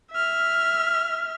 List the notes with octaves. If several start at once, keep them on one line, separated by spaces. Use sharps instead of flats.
E5 F6